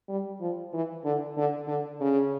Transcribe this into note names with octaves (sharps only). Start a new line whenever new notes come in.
G3
F3
E3
D3
D3
D3
C#3